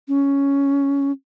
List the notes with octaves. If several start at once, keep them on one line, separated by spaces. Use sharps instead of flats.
C#4